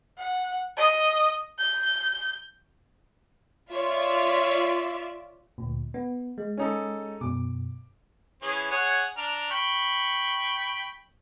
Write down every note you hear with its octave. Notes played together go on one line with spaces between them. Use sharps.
F#5
D#5
G6
F4 C#5 D5 E5
D2 A#2
B3
G#3
C#4 D#4 A4
F#2 B2 D6
E3 C#4 G#4
G#4 C#5 F#5
D4 A#5 F6
G5 B5 C#6